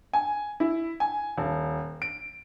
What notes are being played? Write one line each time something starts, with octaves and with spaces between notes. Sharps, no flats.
G#5
E4
G#5
D#1
D7